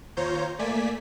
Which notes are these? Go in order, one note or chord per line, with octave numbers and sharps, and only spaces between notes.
D#2 F4 C5 C#5 A#5 G6
A3 A#3 D5 G#5 B6